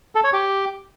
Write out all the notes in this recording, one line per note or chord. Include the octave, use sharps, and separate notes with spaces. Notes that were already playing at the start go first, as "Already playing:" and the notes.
A4
C#5
G4